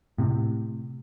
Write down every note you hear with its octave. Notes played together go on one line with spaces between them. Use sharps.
A2 C3